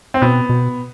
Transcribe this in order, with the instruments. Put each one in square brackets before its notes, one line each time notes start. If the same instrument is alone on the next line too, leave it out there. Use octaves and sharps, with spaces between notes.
[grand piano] C4
[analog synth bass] B2 [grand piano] B3
[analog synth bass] B2